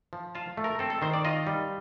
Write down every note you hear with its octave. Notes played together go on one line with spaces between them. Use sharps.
F3
F4 A5
A3
A#4
C4 A4
A4
D#3 C5
D5
F4 D#5
G3